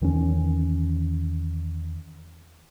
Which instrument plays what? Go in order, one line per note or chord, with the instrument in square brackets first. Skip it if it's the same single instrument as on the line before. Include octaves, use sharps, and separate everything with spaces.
[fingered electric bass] E2 D#3 E3 C#4